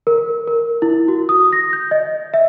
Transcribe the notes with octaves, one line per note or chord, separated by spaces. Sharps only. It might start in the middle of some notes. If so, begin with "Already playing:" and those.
A#4
A#4
E4
F#4
D#6
A#6
G6
D#5
E5